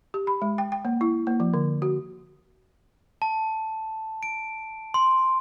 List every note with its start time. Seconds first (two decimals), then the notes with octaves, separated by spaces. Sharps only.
0.14 G4
0.27 B5
0.42 G#3
0.58 G5
0.72 G5
0.85 A#3
1.01 E4
1.27 A#3
1.40 F3
1.54 D3
1.82 F#4
3.22 A5
4.23 D7
4.94 C6